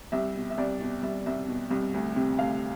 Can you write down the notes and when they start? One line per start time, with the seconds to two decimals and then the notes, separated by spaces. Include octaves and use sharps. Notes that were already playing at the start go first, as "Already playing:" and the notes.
0.12 C2 E5
0.36 B2
0.50 E5
0.58 C2 D5
0.80 B2
1.03 C2 E5
1.26 C2 E5
1.48 B2
1.70 C2
1.94 D2
2.16 C3
2.39 D2 F5